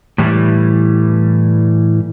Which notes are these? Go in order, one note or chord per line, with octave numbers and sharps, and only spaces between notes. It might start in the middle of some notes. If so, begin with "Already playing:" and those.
A2 E3 G3